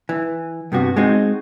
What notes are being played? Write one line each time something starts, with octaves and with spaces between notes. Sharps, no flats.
E3
G2 C3 B3 F#4
G#3 C4 D#4 F#4